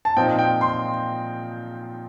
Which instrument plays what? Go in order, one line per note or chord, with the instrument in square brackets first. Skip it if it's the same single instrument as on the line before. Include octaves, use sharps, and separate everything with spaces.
[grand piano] A5
A#2 F3 C4 D#4 G5
G5
C6